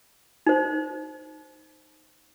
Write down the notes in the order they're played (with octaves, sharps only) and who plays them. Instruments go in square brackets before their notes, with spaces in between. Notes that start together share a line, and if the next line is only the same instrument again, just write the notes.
[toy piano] D#4 C5